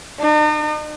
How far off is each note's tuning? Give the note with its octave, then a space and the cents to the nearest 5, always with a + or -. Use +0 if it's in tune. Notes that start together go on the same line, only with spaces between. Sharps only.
D#4 -45